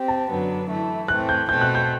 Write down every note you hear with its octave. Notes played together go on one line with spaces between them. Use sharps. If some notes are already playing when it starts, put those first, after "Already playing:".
Already playing: C4 G4
A5
F#2 D3 F#3 B3 D4
E3 A3 E4
A2 E3 A3 C4 F#6
G6
B2 A3 C4 G6
F#6
G6